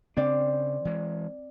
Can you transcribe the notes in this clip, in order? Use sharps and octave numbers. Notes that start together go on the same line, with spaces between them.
C#3 C4 D4 D5
E3 G#3